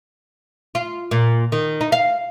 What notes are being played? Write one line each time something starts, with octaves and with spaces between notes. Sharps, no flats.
F4
A#2
D#3
D#4
F5